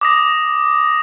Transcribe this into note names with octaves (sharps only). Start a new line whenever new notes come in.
D6 D#6 A#6